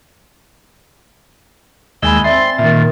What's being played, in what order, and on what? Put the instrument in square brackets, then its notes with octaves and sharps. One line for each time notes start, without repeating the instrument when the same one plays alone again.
[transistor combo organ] D#2 G#3 E6 [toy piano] D#5 G#5 B5 [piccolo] G7
[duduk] C4 [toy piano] D5 E5 [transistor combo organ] C6 [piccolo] A6
[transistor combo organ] A#2 [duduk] D#3 [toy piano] E5